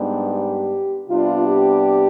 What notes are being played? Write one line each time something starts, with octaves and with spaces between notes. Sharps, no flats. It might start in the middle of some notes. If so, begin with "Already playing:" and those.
Already playing: G#2 G3 B3 D4
G4
C3 G3 B3 D4 F4
G4